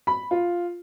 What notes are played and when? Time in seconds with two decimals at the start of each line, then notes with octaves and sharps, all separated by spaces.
0.07 B5
0.31 F4